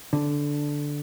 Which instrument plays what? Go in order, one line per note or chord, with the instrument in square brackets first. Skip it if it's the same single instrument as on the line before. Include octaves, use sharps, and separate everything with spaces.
[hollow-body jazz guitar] D3